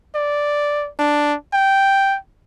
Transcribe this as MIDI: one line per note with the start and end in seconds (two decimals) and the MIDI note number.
0.15 0.89 74
0.99 1.35 62
1.53 2.17 79